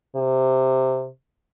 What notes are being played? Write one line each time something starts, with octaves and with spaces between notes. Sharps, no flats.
C3